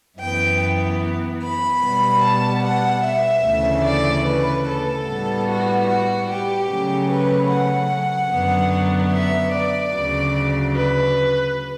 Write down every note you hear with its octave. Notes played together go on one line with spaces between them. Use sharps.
F#2 E3 B3 G5
B5
B2 G3 B3
A5
F#5
E5
D2 C#3 E3 A3 C#4
D5
B4
A4
A2 G3 B3
F#4
F#4
G4
C#3 F#3 A3 C#4
B4
F#5
F#2 D3 F#3 B3
E5
D5
D2 C#3 F#3
B4